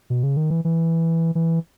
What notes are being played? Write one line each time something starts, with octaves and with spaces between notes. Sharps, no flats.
B2
C#3
D#3
E3
E3
E3